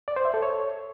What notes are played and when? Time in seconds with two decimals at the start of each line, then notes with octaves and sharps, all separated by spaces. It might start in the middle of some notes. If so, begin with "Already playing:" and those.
0.08 D5
0.16 C5
0.25 E5
0.34 A4
0.42 C#5